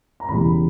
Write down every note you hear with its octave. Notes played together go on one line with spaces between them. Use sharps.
A#5
E1 E2 C#3 E3 G3 B5